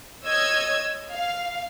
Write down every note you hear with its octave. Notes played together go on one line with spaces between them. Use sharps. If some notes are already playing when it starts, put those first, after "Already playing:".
C#5 D#5 E6 G#6
F5